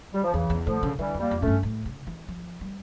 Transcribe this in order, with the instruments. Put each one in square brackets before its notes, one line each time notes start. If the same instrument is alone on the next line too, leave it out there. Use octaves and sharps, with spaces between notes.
[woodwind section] G3
F3
[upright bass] E2 [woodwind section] C#3 E3
[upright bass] E2
[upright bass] A2 [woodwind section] D3 F3
[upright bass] C#3
[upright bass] D3 [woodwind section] E3 G3
[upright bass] F2
[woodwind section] G3 A#3
[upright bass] F2
[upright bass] A2 [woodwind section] A3 C#4
[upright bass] G2
A2
C#3
E3
F3
G3